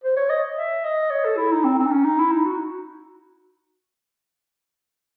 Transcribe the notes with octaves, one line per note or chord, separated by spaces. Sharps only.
C5
C#5
D#5
E5
D#5
C#5
A4
E4
D#4
C4
C4
D#4
C#4
D#4
E4
D#4
F#4